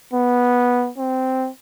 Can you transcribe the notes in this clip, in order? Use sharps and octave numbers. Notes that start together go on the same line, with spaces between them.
B3
C4